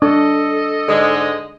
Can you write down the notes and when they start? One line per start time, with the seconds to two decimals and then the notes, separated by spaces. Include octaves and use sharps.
0.02 D4 A4 D#5
0.88 G#2 D3 G#3